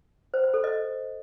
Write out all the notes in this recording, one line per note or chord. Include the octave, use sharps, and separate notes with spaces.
C5
C5
A4
D#5